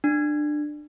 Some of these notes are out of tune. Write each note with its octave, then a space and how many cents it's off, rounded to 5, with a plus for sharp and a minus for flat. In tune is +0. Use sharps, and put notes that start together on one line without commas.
D4 +20